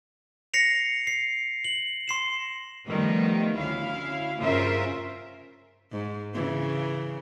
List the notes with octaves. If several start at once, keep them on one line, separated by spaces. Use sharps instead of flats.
A#6 C7 C#7 F7
C7
F#7
C6 C7 E7
D#3 F3 G3 A3 B3
D2 C#4 E4 F5
G2 C#3 F4 A#4 C5 E5
G#2
C#3 E3